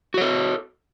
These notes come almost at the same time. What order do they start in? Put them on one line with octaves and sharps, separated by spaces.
F#4 C#5 A4